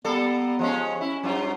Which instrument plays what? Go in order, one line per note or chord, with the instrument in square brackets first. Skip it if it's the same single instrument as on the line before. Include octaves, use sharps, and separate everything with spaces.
[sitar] G3 A#3 A4 [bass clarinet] B3
[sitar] F3 G#3 C#4
[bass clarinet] C#4 [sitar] E4
[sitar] G2 F#3 F4